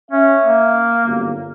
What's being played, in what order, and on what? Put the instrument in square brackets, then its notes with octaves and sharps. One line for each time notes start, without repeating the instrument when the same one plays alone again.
[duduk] C#4 [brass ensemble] E5
[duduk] A#3
[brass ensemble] G1 F#2